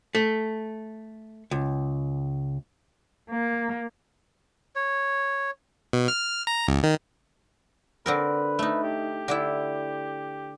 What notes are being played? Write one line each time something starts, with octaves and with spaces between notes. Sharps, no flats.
A3
C#2
A#3
C#5
B2
F6
A#5
C#2
D#3
D3 C4 A#4 B4
A3 D#4
G4
D3 D4 E4